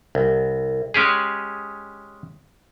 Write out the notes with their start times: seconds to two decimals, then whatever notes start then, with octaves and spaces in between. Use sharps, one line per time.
0.15 C2
0.94 G#3 C#4 G4 G#4